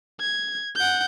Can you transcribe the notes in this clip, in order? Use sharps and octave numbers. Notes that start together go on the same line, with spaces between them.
G#6
F#5 G6